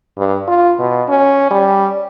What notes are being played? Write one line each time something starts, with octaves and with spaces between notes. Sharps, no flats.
G2
F4
B2
C#4
G3